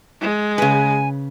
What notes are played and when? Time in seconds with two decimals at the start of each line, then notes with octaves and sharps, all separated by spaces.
0.21 G#3
0.58 C#3 B4 G#5